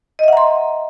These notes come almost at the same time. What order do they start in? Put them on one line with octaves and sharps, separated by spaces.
D#5 E5 F#5 A#5 C6